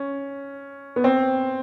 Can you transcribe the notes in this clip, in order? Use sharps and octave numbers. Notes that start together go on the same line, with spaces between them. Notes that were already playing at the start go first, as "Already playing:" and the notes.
Already playing: C#4
B3
C4